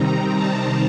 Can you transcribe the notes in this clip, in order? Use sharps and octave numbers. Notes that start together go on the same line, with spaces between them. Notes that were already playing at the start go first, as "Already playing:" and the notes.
Already playing: C3 D#3 G3 C4 D#4 A#5
A5